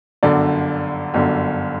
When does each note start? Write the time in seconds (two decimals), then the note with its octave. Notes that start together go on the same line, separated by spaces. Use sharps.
0.23 G1 F#2 D3 D5
1.14 G1 F#2 D3